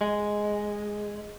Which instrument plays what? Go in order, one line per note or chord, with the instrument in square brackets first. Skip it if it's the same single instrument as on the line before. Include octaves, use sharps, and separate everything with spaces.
[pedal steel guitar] G#3